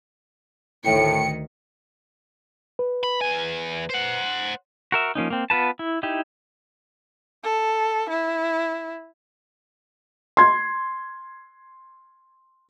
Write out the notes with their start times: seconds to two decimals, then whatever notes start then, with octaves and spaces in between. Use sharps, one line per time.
0.84 D2 A2 D#3 G5 C#7
2.79 B4
3.04 B5
3.21 E2 G#5
3.89 C5 F#5
4.92 F#4 A#4 E5
5.15 F3 A#3 C#4 D#4
5.30 A#3 C4
5.50 B3 F4 B4 A5
5.79 E4
6.03 D#4 E4 G4
7.44 A4
8.10 E4
10.37 C6 G#6